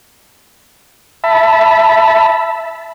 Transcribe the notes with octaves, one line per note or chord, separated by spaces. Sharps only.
E5 A5 B5